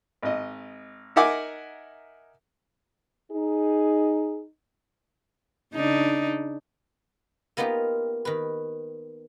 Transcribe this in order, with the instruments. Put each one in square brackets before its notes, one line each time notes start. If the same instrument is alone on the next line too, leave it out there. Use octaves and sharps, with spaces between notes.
[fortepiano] G#1 D#5
D#4 A#4 E5 F#5 G#5 D6
[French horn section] D#4 [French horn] G#4
[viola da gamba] C#3 D4 D#4
[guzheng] A#3 B3 D#4 F4 G4
D#3 B4